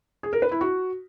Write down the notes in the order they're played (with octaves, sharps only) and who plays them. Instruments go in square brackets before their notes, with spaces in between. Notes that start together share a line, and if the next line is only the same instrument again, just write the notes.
[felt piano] G#4
A#4
B4
E4
F#4